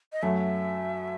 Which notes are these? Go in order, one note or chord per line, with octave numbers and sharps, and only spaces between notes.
D#5
F#2 F#3 A3 E5